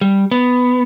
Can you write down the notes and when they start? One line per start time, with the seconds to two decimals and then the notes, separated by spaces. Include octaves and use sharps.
0.01 G3
0.31 B3